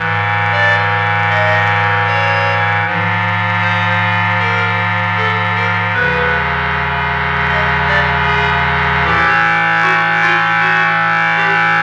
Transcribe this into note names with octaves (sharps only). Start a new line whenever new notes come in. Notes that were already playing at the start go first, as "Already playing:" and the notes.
Already playing: G#2 E3
D5
D#5
C#5
G#2 F3
C5
A#4
A4
A#4
D#2 C#3 F3 B4
D#5
D5
G#4
A2 E3 G4
F#4
F4
F#4
G4